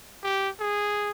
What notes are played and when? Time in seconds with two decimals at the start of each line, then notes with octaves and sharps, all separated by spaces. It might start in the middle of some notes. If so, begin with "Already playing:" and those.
0.23 G4
0.60 G#4